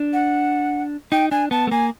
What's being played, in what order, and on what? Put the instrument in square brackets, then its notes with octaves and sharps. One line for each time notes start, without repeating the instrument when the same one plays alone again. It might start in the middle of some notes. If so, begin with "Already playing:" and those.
Already playing: [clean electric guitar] D4
[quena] F#5
[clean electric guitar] D#4 [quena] G5
[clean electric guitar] D4 [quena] G#5
[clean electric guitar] B3 [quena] A5
[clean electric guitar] A3
[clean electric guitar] A#3 [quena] G#5